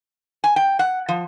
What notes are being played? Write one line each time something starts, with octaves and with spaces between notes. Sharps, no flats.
G#5
G5
F#5
F3